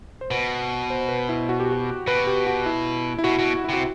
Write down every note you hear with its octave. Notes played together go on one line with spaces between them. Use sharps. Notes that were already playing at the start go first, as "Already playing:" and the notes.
C5
B2 B4
C5
B4
E4
F#4
G4
F#4
B2 B4
G4
F#4
E4
E4
B2 F#4
B2
E4
C3 F#4